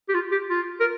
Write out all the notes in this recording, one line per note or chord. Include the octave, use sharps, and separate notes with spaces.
G4
F4
G4
F4
A#4